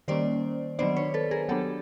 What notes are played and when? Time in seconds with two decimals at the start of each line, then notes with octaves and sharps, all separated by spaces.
0.08 D#3 G3 A#3 C#4 C5 D5
0.79 D#3 F#3 B3 D4 C5 D5
0.96 B4 C#5
1.14 A4 B4
1.31 G#4 A#4
1.49 F#3 B3 D4 G4 A4